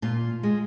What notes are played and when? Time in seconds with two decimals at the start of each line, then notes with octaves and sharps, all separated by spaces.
0.02 A#2 F4
0.43 G#3